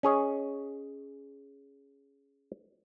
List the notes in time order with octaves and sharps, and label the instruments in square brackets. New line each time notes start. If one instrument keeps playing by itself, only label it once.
[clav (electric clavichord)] C#4 G#4 C#5 D#5